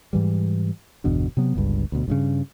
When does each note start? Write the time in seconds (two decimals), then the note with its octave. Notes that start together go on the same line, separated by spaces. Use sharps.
0.13 G#2 E3 G3
1.04 G1 E2 B2 D4
1.37 C3 F#3 B3
1.55 G1 C#2 G2
1.92 D2 B2
2.08 G2 A#2 C#3